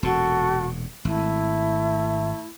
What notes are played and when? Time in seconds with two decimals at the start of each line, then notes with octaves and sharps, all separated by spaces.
0.03 E1 A#2 F#4 A4
1.05 G#1 A3 E4